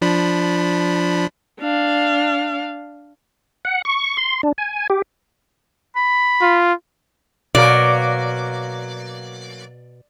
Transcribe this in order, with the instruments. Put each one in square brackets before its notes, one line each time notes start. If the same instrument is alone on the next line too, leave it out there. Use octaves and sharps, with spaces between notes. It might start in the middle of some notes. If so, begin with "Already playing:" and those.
[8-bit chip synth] F3 D4 B5
[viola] D4 F5
[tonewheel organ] F#5
C#6
C6
D4
G#5
G4
[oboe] B5
[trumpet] F4
[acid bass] B2 [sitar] F#3 A#3 A#4 [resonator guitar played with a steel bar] D5